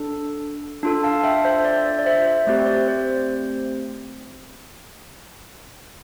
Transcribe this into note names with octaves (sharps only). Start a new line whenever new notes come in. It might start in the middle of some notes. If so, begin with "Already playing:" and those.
Already playing: D4 A4
D4 F4 A4
F5 A5
E5 G5
C5 E5
D5
D5
D5
C5 E5
C5 E5
A3 C4 G4 D5
C5
D5
C5